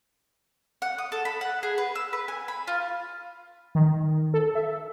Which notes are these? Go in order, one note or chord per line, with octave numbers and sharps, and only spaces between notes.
F#5
D#6
A4
B5
F#5
G#4
B4
E6
B4
G#5
B5
F4
D#3
A4
E5